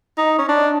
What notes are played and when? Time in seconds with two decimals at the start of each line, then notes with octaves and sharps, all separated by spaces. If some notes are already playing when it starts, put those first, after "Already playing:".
0.18 D#4
0.39 C#4
0.49 D4